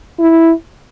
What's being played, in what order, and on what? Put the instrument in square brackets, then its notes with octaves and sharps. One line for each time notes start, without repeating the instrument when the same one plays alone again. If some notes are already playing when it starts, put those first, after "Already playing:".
[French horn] E4